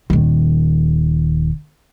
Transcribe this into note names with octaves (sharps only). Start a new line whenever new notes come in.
D#1 D#3